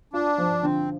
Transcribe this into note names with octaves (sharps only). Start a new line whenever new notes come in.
D4 F4
F3
D3 C4